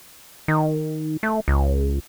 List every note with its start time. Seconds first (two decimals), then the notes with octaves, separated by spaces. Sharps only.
0.48 D#3
1.23 A3
1.48 C#2